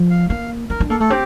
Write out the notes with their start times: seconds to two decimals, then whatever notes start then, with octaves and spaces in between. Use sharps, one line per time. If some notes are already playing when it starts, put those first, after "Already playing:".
Already playing: F3
0.10 F5
0.29 A#3 F5
0.70 D4 A#4
0.80 D4
0.90 A#3 A4
1.00 A3 A4
1.10 C4 G4